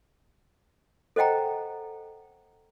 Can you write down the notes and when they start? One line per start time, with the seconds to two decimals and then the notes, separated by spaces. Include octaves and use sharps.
1.16 A4 C5 D#5 F#5 G5 A#5